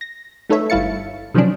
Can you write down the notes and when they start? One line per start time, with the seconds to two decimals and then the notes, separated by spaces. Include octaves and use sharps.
0.01 A#6
0.49 A3 D#4 A4 B4 C#5 E5
0.70 G1 G2 E4 F5 A6 C#7
1.34 C3 D#3 F3 F#3 C#4 D4